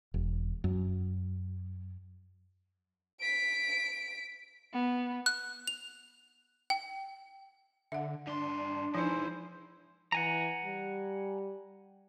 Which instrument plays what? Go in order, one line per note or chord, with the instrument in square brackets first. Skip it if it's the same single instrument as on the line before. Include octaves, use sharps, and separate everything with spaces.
[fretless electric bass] E1
F#2
[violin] B6 D7
[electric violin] B3
[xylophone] F#6
F7
G5
[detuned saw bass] D3 [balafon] E5 F#5
[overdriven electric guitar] G2 C6 [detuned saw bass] D4
[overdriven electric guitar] E3 G#3 [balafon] F3 D#4 [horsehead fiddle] E4 C5
[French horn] E3 [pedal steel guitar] F#5 G#5 A#5
[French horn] G3